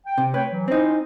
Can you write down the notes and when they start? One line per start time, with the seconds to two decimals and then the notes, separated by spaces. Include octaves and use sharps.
0.06 G5
0.18 C3
0.34 A3 B4 C#5 G5
0.51 E3 F#3
0.68 C4 C#4 D#4 E4 C5